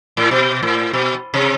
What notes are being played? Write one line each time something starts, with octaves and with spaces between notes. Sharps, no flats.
A2
B2
A2
B2
C3